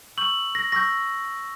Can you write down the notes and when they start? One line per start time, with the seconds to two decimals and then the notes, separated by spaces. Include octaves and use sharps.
0.18 C#6 E6 G6 F#7
0.55 A#6
0.72 C#6 E6 G6 A#6